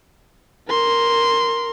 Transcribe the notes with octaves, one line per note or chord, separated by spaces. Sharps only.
A#4 C6